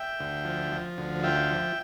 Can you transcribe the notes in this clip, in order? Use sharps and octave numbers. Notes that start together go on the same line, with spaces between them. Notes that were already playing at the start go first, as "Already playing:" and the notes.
Already playing: E5 G5
D2
F3
F3
D2
F4 E5 G5
F3